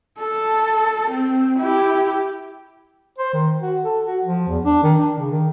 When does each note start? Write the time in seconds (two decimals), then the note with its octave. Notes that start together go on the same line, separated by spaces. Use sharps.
0.20 A4
1.10 C4
1.60 E4 G4
3.18 C5
3.33 D#3
3.62 F#4
3.84 A4
4.06 F#4
4.25 F3
4.48 E2
4.65 D4
4.83 D#3
4.98 D4
5.18 C#3
5.30 D#3